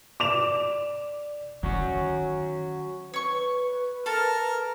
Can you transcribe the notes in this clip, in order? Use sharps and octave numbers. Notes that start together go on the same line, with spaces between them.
D5 D6 E7 F7
D#3 F#3 C#4 F#4
B4 C#5 C#6
A4 A#4 A5